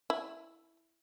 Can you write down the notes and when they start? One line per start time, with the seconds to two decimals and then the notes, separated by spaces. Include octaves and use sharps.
0.10 E4